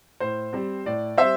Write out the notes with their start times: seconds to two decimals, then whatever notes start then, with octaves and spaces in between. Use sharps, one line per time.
0.20 A2 C5
0.53 G3 C4
0.86 A2 D5
1.18 G3 C4 C5 E5